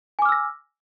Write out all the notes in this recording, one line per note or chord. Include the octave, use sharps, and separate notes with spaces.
G#5 D6 E6 F6 A#6